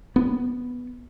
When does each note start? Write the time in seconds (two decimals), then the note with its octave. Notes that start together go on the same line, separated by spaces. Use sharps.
0.16 B3